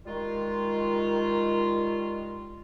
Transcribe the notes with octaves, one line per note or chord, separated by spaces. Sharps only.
D#3 G3 G#3 F4